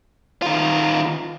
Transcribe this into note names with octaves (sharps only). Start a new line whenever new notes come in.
D#3 F4